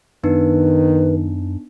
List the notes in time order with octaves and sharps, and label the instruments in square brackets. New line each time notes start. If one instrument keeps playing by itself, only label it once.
[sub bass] F#2 [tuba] D#3 [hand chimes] B3 D4 D#4 [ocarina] B4